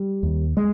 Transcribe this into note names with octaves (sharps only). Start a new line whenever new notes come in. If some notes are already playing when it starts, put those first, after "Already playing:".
Already playing: G3
D#2
G#3